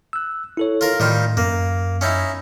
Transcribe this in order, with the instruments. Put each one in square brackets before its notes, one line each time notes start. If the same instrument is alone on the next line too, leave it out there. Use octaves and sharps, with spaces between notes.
[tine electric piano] E6 F#6
E4 A4 C#5
[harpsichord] F4 A#4
[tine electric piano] A2 [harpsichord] D#3 G3 F4
[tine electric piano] F#2 [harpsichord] A#3
[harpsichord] C#4 D#4 E4